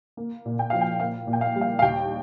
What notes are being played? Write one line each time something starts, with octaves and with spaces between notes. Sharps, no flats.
A#3
A#2
G5
F3 F5
G5
A#3 F5
A#2
G5
F5
G3
F5
F5
D#2 G5